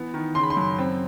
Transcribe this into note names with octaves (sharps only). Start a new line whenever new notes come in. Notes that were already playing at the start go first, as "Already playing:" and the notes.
Already playing: E3 B3
D#3
C#3 C6
B5
C6
F#2
C4